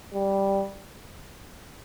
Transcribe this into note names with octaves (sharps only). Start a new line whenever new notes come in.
G3